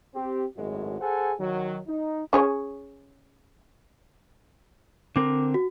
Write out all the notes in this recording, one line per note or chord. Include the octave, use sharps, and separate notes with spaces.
C4 G4
G#1 F#2 A2 G#3 F#4
G#4 A4 C5 F#5 G#5
D#3 F#3
D#4
C#4 G#4 C#5
D3 C4 A#4 D6
F#4